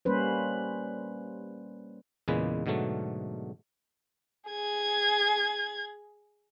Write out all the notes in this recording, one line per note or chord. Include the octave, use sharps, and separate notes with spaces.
G3 A#3 C#4 B4 C5
E2 A#2 C#3 G#3 B4
G#2 B2 D3 F#3 A3
G#4 G#6